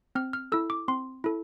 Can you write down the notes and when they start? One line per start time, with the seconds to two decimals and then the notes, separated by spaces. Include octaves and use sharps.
0.15 C4 F6
0.33 F6
0.52 E4 A4 E6
0.70 D6
0.88 C4 C6
1.24 E4 A4